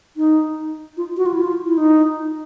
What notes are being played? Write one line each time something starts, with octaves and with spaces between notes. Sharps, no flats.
D#4
F4
F#4
F4
E4
F4
E4
D#4